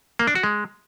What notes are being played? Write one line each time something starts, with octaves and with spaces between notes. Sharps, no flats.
A#3
D4
F#4
G#3